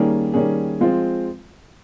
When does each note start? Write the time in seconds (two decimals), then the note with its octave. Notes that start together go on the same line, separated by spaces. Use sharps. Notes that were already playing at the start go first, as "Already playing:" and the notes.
Already playing: D#3 G3 A#3 C#4 G#4
0.34 D#3 G3 A#3 C#4 G#4
0.80 F3 G#3 C4 F4 C5